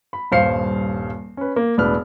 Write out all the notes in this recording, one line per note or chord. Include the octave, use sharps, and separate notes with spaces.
B5
D#1 G2 C5 F5 C7 C#7
C#4 B4
A#3
E1 A2 D4 B4 F6